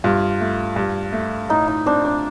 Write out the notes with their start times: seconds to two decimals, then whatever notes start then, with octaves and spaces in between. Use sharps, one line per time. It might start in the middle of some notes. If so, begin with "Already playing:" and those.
0.04 G2 F4
0.41 A3
0.76 G2
1.13 A3
1.49 A2 D#4
1.68 D#4
1.86 C4 D4
2.05 D4